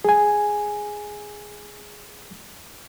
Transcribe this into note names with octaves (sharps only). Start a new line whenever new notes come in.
G#4 G#5